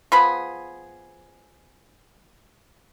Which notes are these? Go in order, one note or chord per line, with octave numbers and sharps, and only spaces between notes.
F3 B3 G#4 B5